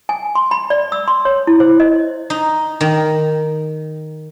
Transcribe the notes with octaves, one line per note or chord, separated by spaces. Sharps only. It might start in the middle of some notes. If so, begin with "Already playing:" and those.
G#5
C6
B5
D5
E6
C6
C#5
E4
C5
D#5
D#4
D#3